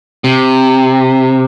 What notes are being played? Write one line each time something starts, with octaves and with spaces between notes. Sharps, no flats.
C3